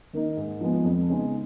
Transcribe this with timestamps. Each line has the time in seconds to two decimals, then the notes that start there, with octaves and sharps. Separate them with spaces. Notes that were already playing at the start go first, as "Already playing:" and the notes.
0.13 D#3 A#3 D#4
0.37 G#2
0.61 F3 G#3 B3
0.85 F2
1.08 C#3 G#3 B3 D#4